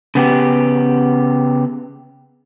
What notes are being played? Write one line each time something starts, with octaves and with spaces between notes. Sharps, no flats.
C#3 B3 G4